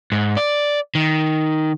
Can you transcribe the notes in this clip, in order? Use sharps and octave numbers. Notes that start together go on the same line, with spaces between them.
G#2
D5
D#3